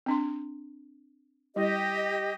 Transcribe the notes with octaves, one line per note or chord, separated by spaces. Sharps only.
C4 D4 C6
G3 E4 G4 D#5